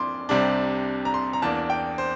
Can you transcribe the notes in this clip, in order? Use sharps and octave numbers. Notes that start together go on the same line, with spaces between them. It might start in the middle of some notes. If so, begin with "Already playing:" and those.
Already playing: F2 D4 C6 D6
C2 C3 G3 D4
A#5
C6
A#5
E2 E3 A#3 D4 A5
G5
C5